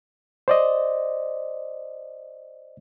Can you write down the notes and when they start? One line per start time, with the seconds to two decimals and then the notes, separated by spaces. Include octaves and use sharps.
0.48 C5 D5 D#5